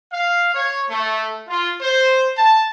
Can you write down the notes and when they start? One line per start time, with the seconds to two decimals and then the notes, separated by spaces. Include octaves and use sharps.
0.12 F5
0.53 C#5
0.89 A3
1.47 F4
1.81 C5
2.36 A5